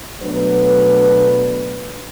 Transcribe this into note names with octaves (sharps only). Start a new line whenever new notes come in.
B2 F#3 A3 D4 B4